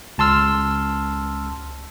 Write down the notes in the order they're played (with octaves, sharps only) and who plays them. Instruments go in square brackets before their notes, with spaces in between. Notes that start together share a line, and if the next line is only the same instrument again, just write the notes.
[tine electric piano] C#2 A5 C6 E6 F6